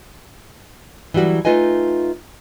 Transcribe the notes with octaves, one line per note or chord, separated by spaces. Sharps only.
E3 F#3 G3 F#4
A3 D#4 F4 B4 D#5 G#5